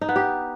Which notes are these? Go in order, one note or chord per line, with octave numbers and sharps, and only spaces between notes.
D#4
B3
G4